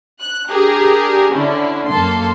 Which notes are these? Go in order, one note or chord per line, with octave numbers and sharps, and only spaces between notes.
F#6
D4 G4 G#4 A#4
D3 C#4 D4 E4
F#2 A#3 A4 C6